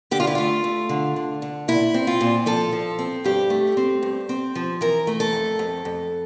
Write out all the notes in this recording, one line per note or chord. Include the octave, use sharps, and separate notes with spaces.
D3 G4
F4
E4
A3 F4
A3
D3
D3
D3
A#2 E4
C4
F4
A#2
F3 A4
F3
C4
G2 G4
A3
C4
G2
C4
F3
E3 A#4
A3
A4
F2
F2
F2